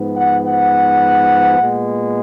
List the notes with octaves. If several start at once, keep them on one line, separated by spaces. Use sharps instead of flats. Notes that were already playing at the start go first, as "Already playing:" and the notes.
Already playing: G#2 F3 B3
F#5
F#5
A#2 G#3 B3